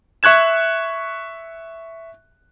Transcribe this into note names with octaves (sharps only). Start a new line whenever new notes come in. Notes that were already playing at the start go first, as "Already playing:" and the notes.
E5 C#6 F#6 G#6 E7